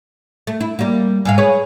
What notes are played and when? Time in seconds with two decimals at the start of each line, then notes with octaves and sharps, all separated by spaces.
0.47 A3
0.61 E4
0.79 G3 A#3
1.25 G#2 G#3 F5
1.38 G#4 B4 C#5